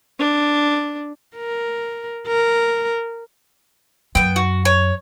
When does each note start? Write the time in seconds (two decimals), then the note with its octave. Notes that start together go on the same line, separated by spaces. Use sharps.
0.19 D4
1.36 A#4
2.27 A#4
4.15 F#2 B3 G5
4.36 F#4
4.65 C#5